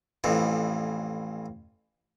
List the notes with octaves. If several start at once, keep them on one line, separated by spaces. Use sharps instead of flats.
A1 F2 E3